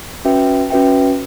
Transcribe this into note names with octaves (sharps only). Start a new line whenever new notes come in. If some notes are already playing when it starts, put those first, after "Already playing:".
C#4 F#4 B4 E5 G5
C#4 F#4 B4 E5 G5